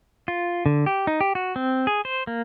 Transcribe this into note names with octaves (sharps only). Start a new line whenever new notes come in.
F4
D3
G4
D#4
G4
F#4
C4
G#4
C5
A#3